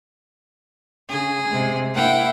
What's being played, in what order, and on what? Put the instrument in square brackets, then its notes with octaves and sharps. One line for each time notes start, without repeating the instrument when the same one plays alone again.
[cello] C#3 [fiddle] G#4
[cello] C3 G#3
[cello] A#3 E4 [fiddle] F#5 G5